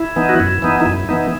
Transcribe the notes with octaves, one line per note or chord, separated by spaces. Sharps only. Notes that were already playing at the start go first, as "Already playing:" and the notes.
Already playing: E4
E3 B3 D#4
F#4
F#2 E4
E3 B3 D#4
D#4
F#2 E4
E3 B3 D#4